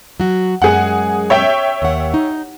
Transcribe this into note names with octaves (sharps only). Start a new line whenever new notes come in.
F#3 F#4
F#2 G#3 G#4 F#5
C#5 E5 G5
D#2 F#5
D#4